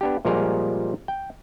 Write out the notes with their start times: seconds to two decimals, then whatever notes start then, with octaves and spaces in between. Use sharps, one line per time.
0.01 B3 D4 G4
0.25 A#2 F3 G3 G#3 G#4 A#4
1.08 G5